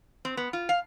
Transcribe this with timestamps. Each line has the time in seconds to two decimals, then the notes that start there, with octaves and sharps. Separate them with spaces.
0.25 C4
0.37 B3
0.53 F4
0.69 F5